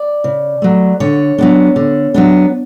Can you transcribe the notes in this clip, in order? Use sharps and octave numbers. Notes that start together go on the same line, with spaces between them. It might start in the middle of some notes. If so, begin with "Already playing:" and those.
Already playing: D5
C#3
F#3 A3
D3 C#5
F#3 B3 D4
D3
F#3 B3 D4